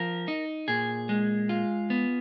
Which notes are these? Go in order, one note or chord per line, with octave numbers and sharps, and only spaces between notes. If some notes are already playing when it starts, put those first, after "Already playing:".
Already playing: F3 A#4
D#4
A#2 G#4
G#3
F4
B3